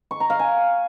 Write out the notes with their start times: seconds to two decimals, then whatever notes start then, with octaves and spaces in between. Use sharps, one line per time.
0.11 C#6
0.20 A#5
0.30 F5
0.39 G#5